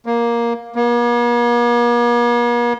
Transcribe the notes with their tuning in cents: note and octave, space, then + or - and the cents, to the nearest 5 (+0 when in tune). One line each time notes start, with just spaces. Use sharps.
A#3 +10
A#3 +45